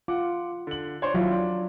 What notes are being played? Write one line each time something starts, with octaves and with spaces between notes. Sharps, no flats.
F4 F#5 D6
D3 F#7
D4 C5 C#5
D#2 F#3 E4 F4
D4